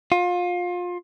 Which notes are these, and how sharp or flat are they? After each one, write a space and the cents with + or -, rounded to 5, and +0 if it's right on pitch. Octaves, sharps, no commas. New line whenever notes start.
F4 +25